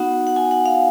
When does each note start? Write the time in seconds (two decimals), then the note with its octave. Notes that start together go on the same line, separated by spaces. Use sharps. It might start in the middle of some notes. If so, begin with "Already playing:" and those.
Already playing: B3 D#4 F#4 F#5
0.27 F#5
0.36 G#5
0.51 F#5
0.66 F5